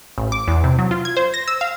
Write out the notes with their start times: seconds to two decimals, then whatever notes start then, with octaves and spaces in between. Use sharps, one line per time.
0.18 A1
0.32 D6
0.48 E2
0.64 C3
0.79 F#3
0.91 F4
1.05 G#6
1.17 C5
1.34 A#6
1.48 E6
1.61 F5